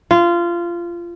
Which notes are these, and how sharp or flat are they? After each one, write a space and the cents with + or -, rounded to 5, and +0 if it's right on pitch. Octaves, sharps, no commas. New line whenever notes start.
F4 -20